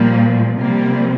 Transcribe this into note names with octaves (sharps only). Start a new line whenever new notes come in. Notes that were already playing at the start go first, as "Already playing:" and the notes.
Already playing: A#2 F3 G3 A#3
C3 F3 G3 A#3